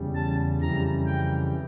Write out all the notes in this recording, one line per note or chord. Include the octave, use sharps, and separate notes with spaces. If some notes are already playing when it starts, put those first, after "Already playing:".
Already playing: E2 C#3 G3
A5
F2 C#3 E3 G3 A#5
G5